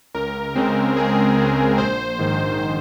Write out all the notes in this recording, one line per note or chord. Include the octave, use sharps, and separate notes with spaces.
C#2 A#4
C#3 G#3 C4
C#2 G#4
C#3 G#3 C4
A#1 C5
G#2 D#3
C5